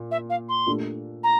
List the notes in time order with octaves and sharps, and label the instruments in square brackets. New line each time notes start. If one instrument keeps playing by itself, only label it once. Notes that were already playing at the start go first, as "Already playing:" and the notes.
Already playing: [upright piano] A#2
[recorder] E5
F5
C6
[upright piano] A#2 A3 D4 G4
[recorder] A#5